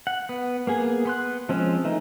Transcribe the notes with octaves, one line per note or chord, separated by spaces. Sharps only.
F#5
B3
A#3 B3 G#4 G#5
B3 C6 F#6
F3 G#3 C4 C#4
E3 A3 D#4